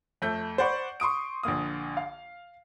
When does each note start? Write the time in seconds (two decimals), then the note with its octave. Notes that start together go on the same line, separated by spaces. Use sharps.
0.22 F2 A3 G6
0.58 C5 D5 F#5 B5 C#6
1.00 C6 C#6 D#6 D7
1.43 A#1 D3 A#3 D#6
1.97 F5